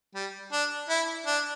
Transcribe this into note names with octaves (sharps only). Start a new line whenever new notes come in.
G3
D4
E4
D4